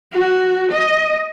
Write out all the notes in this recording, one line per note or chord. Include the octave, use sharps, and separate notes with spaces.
F#4
D#5